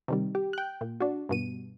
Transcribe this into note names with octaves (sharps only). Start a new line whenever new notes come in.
C3 D#3 G3
G4
G5 F#6
A#2
D4 F#4
G2 B2 D#7